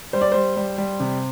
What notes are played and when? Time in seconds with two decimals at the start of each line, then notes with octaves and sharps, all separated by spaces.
0.13 G3 C5
0.21 D5
0.32 G3 C5
0.57 G3
0.78 G3
1.00 C3